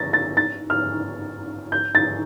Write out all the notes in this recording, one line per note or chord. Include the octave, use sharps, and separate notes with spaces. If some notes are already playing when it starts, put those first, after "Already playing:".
Already playing: A6 A#6
A6
A6
F6
G6
A6